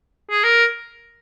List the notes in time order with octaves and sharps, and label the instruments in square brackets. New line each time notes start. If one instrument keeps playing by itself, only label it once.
[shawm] G#4
A#4